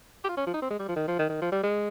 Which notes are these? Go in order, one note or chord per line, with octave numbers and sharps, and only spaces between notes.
G4
F4
C#4
F3
D#4
C4
G#3
G3
F3
D#3
F3
D#3
D#3
F3
G3
G#3